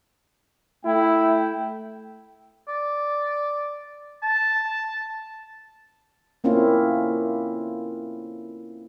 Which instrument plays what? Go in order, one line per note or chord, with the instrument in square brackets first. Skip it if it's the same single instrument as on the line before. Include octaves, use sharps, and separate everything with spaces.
[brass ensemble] A3 G5 [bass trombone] E4
[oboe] D5
A5
[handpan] A3 A#3 C4 C#4 E4 F4